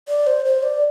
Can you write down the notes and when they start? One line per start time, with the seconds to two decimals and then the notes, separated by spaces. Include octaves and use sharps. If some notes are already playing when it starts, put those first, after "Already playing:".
0.08 D5
0.27 C5
0.45 C5
0.63 D5